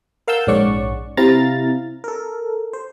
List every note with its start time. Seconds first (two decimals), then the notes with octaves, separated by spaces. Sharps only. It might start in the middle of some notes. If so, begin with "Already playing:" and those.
0.27 A#4 F5 F#5 A5 E6 G6
0.47 A#1 G#2 C#4 D5 F#5 C#6
1.17 C3 C4 E4 F5 A#5 A6
2.04 A4 A#4
2.73 C5